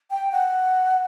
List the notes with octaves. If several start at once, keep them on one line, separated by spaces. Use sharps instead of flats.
G5
F#5